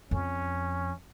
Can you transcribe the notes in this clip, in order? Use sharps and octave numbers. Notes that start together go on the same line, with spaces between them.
F2 C#4